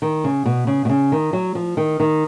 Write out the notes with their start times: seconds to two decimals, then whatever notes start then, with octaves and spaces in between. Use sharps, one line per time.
0.02 D#3
0.24 C#3
0.46 B2
0.67 C#3
0.85 B2
0.89 C#3
1.12 D#3
1.33 F#3
1.55 F3
1.77 D#3
2.00 D#3